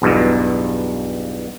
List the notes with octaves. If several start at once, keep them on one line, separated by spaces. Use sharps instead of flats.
B1 E2 G2 B2